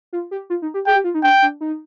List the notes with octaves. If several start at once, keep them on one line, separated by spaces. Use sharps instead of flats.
F4
G4
F4
D#4
G4
G#4 G5
G4
F4
D#4
D4 G5
D4
D#4